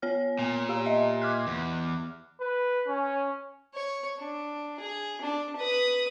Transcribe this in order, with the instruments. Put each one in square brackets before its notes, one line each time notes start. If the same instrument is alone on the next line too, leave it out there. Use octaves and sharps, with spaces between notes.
[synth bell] B3 C#5 F6
[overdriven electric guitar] A#2
[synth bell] G4 F5 A#5
D#5 E5
D6 F6 F#6
[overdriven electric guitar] E2
[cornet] B4
C#4
[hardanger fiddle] C#5
D4
G#4
D4
B4 D#6